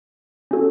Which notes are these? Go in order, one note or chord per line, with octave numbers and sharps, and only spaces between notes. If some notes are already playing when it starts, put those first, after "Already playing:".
C#4 F#4 A4